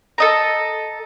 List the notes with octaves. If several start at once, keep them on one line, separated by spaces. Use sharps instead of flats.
A4 D#5 A#5